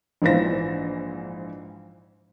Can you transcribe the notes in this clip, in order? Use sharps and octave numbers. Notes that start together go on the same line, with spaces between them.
A#1 G#2 E3 F4 C5 A#6